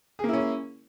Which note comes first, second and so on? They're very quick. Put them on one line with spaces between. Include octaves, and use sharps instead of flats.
G#4 A#3 E4 C#4